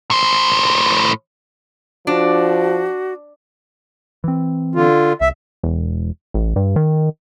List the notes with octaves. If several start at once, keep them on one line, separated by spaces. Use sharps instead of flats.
A2 C5
F3 D4 F#4
E3 C4
D3 F4
C2 E5
E1
A1
G2
D#3